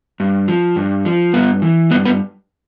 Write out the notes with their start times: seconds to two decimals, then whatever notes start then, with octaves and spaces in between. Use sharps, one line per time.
0.20 G2
0.48 F3
0.76 G2
1.05 F3
1.33 G2 B3 B4
1.62 E3
1.91 G2 B3 B4
2.05 B3 B4